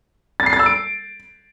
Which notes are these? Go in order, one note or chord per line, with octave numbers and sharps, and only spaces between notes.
A6
C7
A6
E6
D7